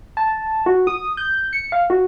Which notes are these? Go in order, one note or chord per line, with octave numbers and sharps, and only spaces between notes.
A5
F#4
D#6
G6
C#7
F5
F#4